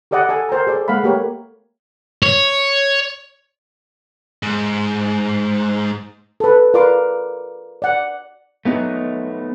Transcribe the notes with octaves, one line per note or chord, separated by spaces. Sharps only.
G4 A4 D5 D#5 F#5
A4 D#5 G#5
A#4 C5 G5 A#5
G#4 A4 D5
G#3 A#3 F5 F#5 B5
A3 A#3 G4 A#4 B4 C#5
C#5
G#2
A4 B4
F4 A#4 B4 D5 C6 D6
D5 F#5
A3 B3 D#4